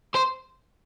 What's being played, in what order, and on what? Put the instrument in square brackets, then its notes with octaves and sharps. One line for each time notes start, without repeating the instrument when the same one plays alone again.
[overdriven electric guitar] C5